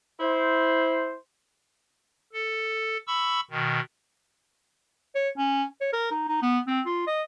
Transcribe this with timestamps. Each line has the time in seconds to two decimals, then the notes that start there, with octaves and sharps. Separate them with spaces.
0.20 E4 C5
2.33 A4
3.07 B5 C#6 E6
3.51 B2 D#3
5.15 C#5
5.38 C#4
5.81 C#5
5.93 A#4
6.11 D#4
6.28 D#4
6.42 B3
6.67 C4
6.86 F4
7.07 D#5